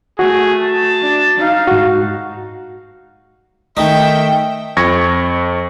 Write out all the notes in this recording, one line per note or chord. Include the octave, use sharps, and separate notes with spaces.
A3 F#4 G#4
A5
D4
D#4 F5
G#2 F#4
D#3 A3 D#4 E5 G5
F2 C#6 G#6 A#6